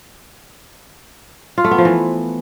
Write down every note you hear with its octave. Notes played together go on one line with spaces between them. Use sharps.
F4
A3
B3
F3
E3